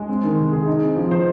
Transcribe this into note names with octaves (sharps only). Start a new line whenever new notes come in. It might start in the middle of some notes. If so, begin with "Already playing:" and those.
Already playing: G#3
C4
D#3
C3
G#4
D#4
C4
F3
C5